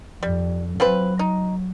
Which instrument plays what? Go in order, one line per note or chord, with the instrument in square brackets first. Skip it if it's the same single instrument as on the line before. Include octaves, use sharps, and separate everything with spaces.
[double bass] F2 [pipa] G3
[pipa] F3 C4 B4 [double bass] F#3
[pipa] D#4